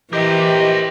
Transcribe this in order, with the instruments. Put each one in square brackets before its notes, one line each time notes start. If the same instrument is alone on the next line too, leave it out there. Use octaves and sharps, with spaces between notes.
[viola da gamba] E3 [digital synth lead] G4 [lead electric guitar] A#4 C5 [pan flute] D#5